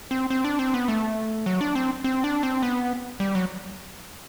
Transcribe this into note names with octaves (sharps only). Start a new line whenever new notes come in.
C4
C4
D4
C4
B3
A3
F#3
D4
C4
C4
D4
C4
B3
G3
F#3